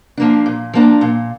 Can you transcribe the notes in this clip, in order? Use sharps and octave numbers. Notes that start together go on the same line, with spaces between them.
F3 A#3 D4
A#2
F3 A#3 D4
A#2